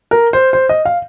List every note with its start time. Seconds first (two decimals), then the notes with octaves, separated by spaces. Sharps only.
0.11 A#4
0.33 C5
0.53 C5
0.69 D#5
0.85 F5